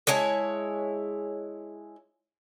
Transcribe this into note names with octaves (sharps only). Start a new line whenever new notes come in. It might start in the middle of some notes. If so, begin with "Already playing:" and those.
G#3 E4 C#5 A5